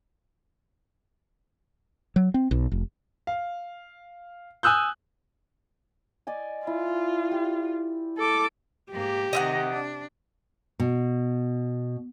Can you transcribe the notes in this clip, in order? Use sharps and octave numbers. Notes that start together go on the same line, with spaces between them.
F#3
C4
B1
F1
F5
G#5 D#6 E6 F#6 G6
D5 D#5 G#5
E4 F4
G4
A4 D6
G#2 A#3 G4
C3 D#3 D#5 E5 F#5
D4
B2